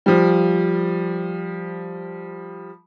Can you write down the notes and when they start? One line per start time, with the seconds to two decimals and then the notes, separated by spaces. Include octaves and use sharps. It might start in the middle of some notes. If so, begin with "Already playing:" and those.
0.06 F3 G3